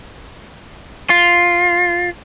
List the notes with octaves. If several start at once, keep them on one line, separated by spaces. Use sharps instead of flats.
F4